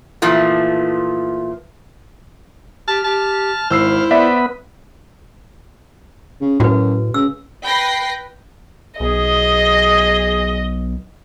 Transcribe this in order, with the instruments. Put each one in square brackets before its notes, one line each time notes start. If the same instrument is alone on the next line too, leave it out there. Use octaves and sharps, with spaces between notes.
[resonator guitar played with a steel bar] A#2 E3 F3 A3
[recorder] G4 [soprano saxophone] A5 [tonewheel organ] F6
[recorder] G4 [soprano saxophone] A5
[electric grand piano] G#1 E6 C7 [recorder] E4 [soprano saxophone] C5
[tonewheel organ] B3 B4 [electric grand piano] D5 E5
[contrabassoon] C#3
[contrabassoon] F#2 [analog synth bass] A2 [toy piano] F#4 B4
[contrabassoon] C#3 [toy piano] E6
[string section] B4 G5 [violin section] B5 A#6 C7
[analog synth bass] B1 [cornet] G#4 [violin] D#5